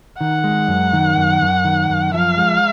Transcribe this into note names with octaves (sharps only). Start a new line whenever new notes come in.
D#3 F#5
G#3
F#2
D#3
F#2
F#2
D#3
F#2
F3 F5
G#3